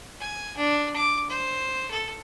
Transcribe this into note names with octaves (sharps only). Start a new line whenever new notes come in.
G#5
D4
D6
C5
A4